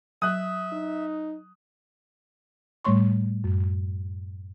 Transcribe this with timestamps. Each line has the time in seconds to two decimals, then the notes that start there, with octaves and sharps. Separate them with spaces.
0.22 F#3 E5 D#6 F#6
0.73 D#4
2.85 A2 G3 A3 C#5 C6 C#6
3.44 F#2